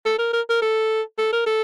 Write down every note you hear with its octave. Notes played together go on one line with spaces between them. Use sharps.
A4
A#4
A#4
A#4
A4
A4
A#4
A4